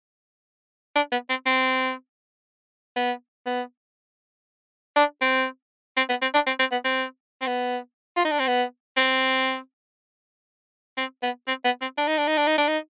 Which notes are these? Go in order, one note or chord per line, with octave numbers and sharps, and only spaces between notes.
D4
B3
C4
C4
B3
B3
D4
C4
C4
B3
C4
D4
C4
C4
B3
C4
C4
B3
F4
D#4
D4
C4
B3
C4
C4
B3
C4
B3
C4
D4
D#4
D4
D#4
D4
D#4
D4
D#4